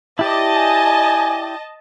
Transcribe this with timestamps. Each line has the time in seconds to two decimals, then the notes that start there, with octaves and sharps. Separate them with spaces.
0.19 E4 G4 D5 D#5 A5
0.56 G#5